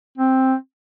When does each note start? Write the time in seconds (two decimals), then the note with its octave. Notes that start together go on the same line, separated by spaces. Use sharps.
0.18 C4